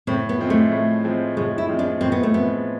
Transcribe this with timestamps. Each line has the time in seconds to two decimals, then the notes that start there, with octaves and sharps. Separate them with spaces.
0.07 A2 C4
0.29 B3
0.39 F3 G#3 C4
0.50 A3
0.72 A2
1.04 F3 G#3 C4
1.37 A2 G#3
1.58 E4
1.68 F3 G#3 C4
1.79 D4
2.01 A2 C4
2.12 B3
2.23 A3
2.32 F3 G#3 B3 C4